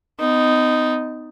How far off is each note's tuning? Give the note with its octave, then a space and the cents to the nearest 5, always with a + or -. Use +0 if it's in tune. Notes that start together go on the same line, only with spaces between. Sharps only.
B3 +45 D#4 +0